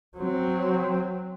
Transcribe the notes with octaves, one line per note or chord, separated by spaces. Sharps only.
F#3 C4